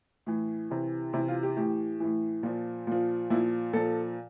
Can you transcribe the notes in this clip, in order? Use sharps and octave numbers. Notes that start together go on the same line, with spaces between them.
A2 E3
C3 E3
C3 E3 E4
F4
G4
A2 E3 G4
A2 E3
A#2 F3
A#2 F3
A#2 F3 E4
A#2 F3 A4